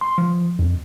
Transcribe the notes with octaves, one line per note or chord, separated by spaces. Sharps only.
C6
F3
F2